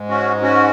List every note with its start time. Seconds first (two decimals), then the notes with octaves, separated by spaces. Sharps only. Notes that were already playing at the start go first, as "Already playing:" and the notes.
Already playing: G#2 G#3
0.09 C#4 F#4
0.42 C#4 F#4